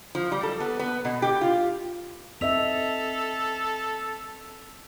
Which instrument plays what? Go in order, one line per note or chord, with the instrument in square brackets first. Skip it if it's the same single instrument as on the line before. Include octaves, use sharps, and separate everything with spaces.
[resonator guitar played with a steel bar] F3
G3
A4
B3
B3
B2
G4
F4
[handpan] C4 D#5 E5 [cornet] A4 [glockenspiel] E6 B6 F7